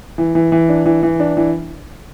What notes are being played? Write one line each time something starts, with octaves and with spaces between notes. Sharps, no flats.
E3
E3
E3
D4
E3
E3
D4
E3